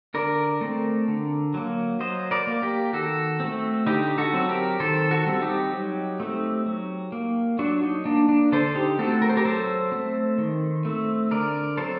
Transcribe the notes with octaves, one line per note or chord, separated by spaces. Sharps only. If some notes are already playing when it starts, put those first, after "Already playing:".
D3 A#4 D5
A3 C4
D3
F#3 A#3
F#3 C5 D#5
A#4 D5
A#3
G4 A#4
D#3 F#4 A4
A3 C4
D3 D#4 G4
F#4 A4
F#3 C4
G4 A#4
D#3 A4 C5
F#4 A4
G3 C4
D#4 G4
F#3
A3 C4
F#3
A#3
F#3 D4 F#4
D#4
A#3 D4
D4
D3 A4 C5
D#4 G4
A3 C4 F#4 A4
A#4
C5
G4 A#4
F#3 A4 C5
A3 C4
D#3
A3 C4
D3 A#4 D5
F#3 C4 A4 C5